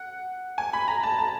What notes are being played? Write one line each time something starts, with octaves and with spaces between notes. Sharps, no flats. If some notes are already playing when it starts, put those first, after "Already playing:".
Already playing: F#5
G#5
B5
A#5
A5
A5